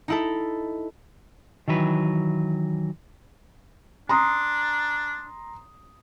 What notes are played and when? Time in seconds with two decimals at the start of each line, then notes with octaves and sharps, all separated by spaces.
0.08 D#4 E4 A4
1.68 D#3 E3 F#3 B4
4.09 D4 A#5 C6 D#6